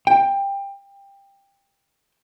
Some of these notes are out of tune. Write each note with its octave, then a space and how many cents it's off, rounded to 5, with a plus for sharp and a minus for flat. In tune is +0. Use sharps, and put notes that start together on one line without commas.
G5 +20